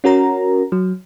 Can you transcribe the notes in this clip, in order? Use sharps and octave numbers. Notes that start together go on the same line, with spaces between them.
C#4 F#4 A#4 A#5
F#3